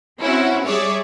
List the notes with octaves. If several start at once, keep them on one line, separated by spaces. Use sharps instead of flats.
C4 C#4 E4 F#4
G3 G#4 C#5 D5 E5